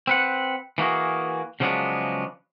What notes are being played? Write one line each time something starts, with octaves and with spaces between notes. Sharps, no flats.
C4 B4 F#5
E3 A#3 F#4 G#4
C#3 F3 F#3 G#3 B3 D4